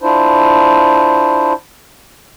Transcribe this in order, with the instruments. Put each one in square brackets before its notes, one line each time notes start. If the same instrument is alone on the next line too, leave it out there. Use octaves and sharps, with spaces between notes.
[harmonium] D4 E4 F4 C5